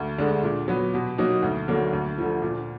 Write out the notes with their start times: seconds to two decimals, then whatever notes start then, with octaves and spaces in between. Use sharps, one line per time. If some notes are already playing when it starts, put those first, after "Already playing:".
Already playing: D2
0.18 D3 G#3 D4
0.43 A#2
0.68 F#3 B3
0.94 B2
1.18 F#3 A#3 D#4 F#4
1.43 D2
1.68 D3 F#3 A#3
1.93 D2
2.18 D3 F3
2.42 A#2